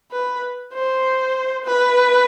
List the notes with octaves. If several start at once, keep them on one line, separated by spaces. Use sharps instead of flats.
B4
C5
B4